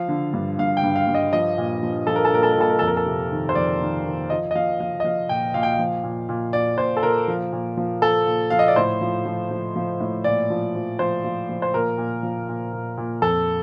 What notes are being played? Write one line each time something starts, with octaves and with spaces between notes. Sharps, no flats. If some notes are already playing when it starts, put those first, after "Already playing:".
Already playing: F3 F5
D3
G2
G2 F5
G5
G2
F5
G2
D#5
F3 D#5
A#2
F3
F3 A4
A#4
A4
A#2 A#4
A4
A#4
A#2 A4
A#4
F2 A4
A#4
A4
C3
D#3
C5
F2 D5
D#3
D#3
F3 D#5
D#5
F3 F5
F3 F5
D#5
F3 F5
A#2 G5
A#2 F5
G5
F5
F3
A#2
A#2
A#2 D5
A#2 C5
A4
A#2 A#4
F3
A#2
F3
F3 A4
A#2
F3 F5
D#5
D5
A2 C5
F3
F3
F3
F3
A2
A#2 D5
F3
F3
F3 C5
F3
F3
C5
A#2 A#4
A#2
F3
A#2
A#2
A#2
F2 A4